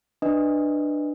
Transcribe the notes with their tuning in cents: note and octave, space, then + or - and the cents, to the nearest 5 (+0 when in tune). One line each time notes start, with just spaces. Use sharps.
D4 +15 B4 +0 D#5 +20